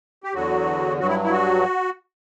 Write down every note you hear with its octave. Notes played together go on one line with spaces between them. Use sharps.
G4
E2 D3 F#3 F#4
G2 F#3 F#4
E4
E4
F#4